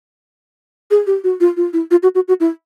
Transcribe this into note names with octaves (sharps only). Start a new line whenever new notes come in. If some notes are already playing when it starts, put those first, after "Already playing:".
G#4
G4
F#4
F4
F4
E4
F4
F#4
F#4
F#4
E4